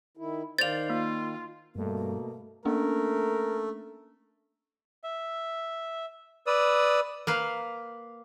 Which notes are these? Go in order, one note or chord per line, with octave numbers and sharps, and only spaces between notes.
D#3 E4
D#3 C5 D5 F5 A6 F7
A#3 F4
G2 B2 A3 A#3
A3 A#3 C#4 D4 A#4
E5
B4 D5 D#6 E6
A#3 B4 F5